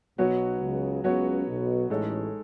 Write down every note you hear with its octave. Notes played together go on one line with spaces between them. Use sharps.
B1 B2 F#3 B3 F#4 C#5
C#2 C#3
C#2 C#3 F#3 B3 F#4 C#5
B1 B2
A1 A2 G#3 D#4 A4 C#5